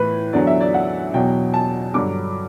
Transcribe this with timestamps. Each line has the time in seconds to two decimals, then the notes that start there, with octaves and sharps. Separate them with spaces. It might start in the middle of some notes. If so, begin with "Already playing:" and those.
Already playing: A2 E3 B4
0.33 E2 D3 F#3 D5
0.47 E5
0.60 D5
0.74 F#5
1.14 E2 B2 F#3 G5
1.54 A5
1.94 G2 D3 F#3 D6